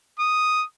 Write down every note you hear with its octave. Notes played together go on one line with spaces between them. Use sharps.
D#6